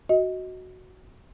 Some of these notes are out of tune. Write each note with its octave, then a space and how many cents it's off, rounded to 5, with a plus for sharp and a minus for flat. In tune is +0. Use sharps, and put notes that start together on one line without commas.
F#4 +0 D#5 +20